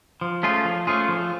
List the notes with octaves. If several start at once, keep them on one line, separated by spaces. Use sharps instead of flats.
F3
A3 C#4 F4 G#4
F3
A3 C#4 F4 G#4
F3